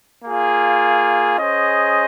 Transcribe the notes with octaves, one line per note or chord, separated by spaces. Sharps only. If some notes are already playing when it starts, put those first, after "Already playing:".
A#3 F4 G#4
C#4 G#4 C5 D#5